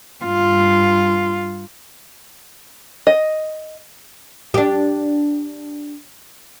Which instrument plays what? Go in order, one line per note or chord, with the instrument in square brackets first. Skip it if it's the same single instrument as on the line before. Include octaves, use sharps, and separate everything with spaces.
[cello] G2 F4
[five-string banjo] D#5
[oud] D4 G4